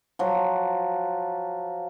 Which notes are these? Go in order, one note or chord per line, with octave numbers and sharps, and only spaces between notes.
F3 F#3